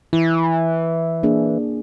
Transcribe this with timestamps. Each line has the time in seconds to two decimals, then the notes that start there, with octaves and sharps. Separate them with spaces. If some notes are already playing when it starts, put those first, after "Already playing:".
0.13 E3 E4
1.23 A#3 D4 G#4